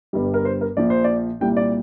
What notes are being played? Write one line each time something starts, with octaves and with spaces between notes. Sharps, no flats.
G1 G2 G3
A#4
C5
A#4
A#1 A#2 F3 D5
C5
D5
C2 A#2 G3 G5
D5